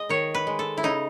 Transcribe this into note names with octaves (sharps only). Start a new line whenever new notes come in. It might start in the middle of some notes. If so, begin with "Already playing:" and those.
Already playing: G#3 D#5
D#3 C#5
B4
G#3
A4
E4
C#3 D#4